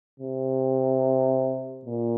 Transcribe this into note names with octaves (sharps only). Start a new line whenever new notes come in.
C3
A#2